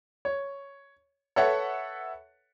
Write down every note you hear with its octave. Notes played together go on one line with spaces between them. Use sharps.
C#5
A4 B4 C#5 E5 F#5